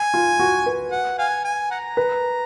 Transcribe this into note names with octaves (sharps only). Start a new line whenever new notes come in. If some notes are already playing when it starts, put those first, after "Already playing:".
Already playing: G#5
F4
F#4
B4
F#5
F5 G#5
G#5
F#5 A#5
B4